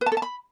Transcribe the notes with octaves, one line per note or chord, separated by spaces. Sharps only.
B4
A5
A4
A5
B5